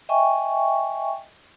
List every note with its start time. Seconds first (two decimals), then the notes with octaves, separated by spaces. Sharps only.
0.09 D#5 E5 G5 G#5 C#6